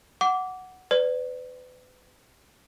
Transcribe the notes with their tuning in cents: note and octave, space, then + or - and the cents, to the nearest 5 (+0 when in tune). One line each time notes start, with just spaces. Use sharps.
F#5 +0 D6 -20
B4 +35 D5 +0